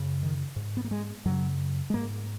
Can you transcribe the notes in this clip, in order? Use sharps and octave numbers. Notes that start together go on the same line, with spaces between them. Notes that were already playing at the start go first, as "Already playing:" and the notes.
Already playing: F#2 C#3
D#3
G#2
B3
A#3
G#3
F#2 C#3 F#3
G#3
G#2 A#3